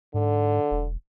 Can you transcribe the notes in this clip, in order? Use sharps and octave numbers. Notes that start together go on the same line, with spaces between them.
G#2 D3
E1